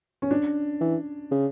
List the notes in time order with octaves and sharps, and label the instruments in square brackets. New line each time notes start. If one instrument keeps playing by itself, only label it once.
[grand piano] C#4
D4
[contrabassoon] E3
C#3